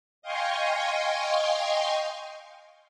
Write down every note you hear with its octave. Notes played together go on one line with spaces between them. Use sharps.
D#5 F5 G5 G#5 C6 C#6